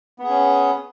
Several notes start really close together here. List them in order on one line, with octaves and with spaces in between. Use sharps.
B3 G#4 C#4